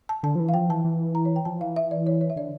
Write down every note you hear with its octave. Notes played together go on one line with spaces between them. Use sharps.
A5
D3 A5
F3
E3
F5
F3 G5
E3 A5
E3
A#5
C#5
G5
F3 A5
E3 F5
E5
D5
C#5
C#5
E5
D3 D5